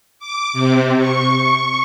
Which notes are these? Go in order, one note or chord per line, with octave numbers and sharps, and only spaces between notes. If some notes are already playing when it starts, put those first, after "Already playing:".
D6
C3
C#6